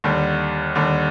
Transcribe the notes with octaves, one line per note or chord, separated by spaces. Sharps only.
D#2 D3 G3
D#2 D3 G3